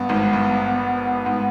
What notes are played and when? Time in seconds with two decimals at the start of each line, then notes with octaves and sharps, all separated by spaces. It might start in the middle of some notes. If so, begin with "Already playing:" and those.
Already playing: G2 B3
0.09 G#1 G#2
0.33 G2
1.26 G#2